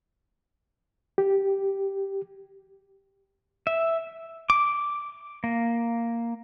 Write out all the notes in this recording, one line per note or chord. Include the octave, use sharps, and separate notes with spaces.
G4
E5
D6
A#3